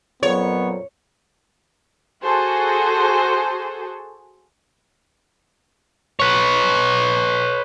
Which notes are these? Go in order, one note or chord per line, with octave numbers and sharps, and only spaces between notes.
F2 A#2 F#3 B3 C#5
F#4 G#4 A4 C5
B4 C#5